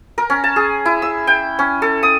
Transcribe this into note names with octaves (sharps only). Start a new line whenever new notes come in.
A#4
C#4
A5
G#4
E4
E6
G5
C#4
A4
D#6